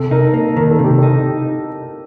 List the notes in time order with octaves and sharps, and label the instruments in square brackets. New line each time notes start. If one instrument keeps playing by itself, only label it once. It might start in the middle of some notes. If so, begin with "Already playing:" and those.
Already playing: [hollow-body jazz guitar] C3 [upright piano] A4
[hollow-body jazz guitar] D#4 [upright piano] A#4
[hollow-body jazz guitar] A#3 [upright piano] A#4
[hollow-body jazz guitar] D#3 [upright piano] A#4
[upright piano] A4
[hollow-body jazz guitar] C3
[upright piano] G4
[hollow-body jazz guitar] D#4 [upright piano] A4